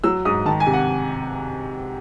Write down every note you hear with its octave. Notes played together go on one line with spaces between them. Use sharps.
F#3 E6
G#2 D#6
D#3 A5
G#5
C3
F#5